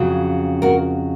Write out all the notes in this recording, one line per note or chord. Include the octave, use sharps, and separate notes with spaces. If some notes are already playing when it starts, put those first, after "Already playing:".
Already playing: F2 C#3 F#3
F#4 A#4